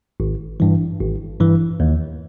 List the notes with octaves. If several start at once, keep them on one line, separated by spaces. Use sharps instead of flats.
G#1
G2 E3
G#1
G2 E3
D#2